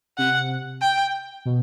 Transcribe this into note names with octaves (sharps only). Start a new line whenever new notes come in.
C3 F#5
G5
B2